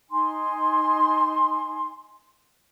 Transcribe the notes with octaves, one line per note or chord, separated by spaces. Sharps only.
D#4 G#5 C6